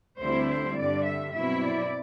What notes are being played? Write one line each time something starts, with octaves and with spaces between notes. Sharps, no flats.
D2 D3 G3 C4 E4 C5
C5
G2 D3 G3 D5
E5
B2 F#3 C4 E4 E5
D5